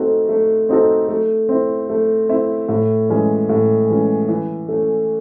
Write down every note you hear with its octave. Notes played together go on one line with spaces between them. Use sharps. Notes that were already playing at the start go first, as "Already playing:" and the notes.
Already playing: A3 C4 D#4 F#4 A4
A3
C4 D#4 F#4 A4
A3
C4 E4
A3
C4 E4
A2
E3 G#3 C#4
A2
E3 G#3 C#4
E3
A3 C#4